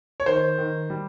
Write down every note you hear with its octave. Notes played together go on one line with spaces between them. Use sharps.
C#5
D#3 C5
D#3
G3